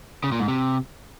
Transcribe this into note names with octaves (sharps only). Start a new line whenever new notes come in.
C#3
A#2
G#2
C3